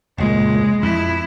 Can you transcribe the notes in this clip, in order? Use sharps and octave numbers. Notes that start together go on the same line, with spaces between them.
F1 C#2 A#2 G#3
F2 E4